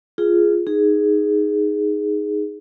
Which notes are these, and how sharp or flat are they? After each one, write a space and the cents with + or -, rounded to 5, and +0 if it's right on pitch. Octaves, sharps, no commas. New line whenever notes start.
F4 -10 G#4 +0
D#4 +0 G#4 +0